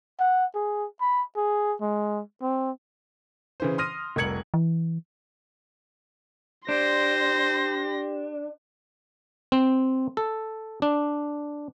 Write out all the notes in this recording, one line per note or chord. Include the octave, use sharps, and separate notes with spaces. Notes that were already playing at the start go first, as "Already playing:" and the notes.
F#5
G#4
B5
G#4
G#3
C4
C#3 E3 C5
C6 D#6 F6 A#6 D#7
F1 C2 A#4 G#6 C#7 F#7
E3
D4 G4 C5 C6 A#6
C4
A4
D4